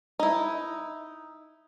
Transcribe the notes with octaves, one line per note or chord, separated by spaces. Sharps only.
D#4 E4